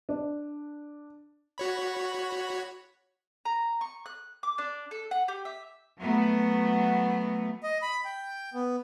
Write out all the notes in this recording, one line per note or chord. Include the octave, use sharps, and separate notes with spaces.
D4
F#4 C#5 B5
A#5
C#6
F#6
D6
D4
A4
F#5
G4
E5
F#3 A3 B3
D#5
B5
G5
B3